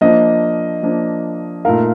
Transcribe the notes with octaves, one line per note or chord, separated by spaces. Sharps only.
F3 A#3 D4 D#5
F3 A#3 D4
A#2 A3 D#4 A#4 F5